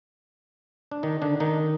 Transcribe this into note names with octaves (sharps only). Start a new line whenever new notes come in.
D4
D#3 D#4
D3 D4
D#3 D#4